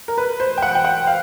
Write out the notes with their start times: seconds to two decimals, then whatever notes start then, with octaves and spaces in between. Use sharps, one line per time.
0.08 A#4
0.18 B4
0.40 C5
0.58 G5
0.62 F#5
0.75 G5
0.85 F#5
1.07 F5